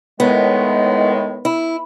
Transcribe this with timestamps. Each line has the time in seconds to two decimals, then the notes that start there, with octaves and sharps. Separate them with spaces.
0.20 A2 D#3 G#3 B3
1.45 E4